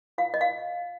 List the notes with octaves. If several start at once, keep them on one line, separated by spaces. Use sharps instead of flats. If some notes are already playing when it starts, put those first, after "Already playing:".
F4 F5
D#5
F5